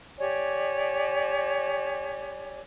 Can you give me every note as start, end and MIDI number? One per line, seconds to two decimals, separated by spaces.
0.19 2.60 67
0.19 2.60 73
0.19 2.60 74
0.19 2.60 80